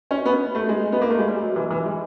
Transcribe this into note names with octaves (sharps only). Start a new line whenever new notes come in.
C#4
B3
A3
G#3
B3
A#3
A3
G#3
G3
F#3
E3
E3
G#3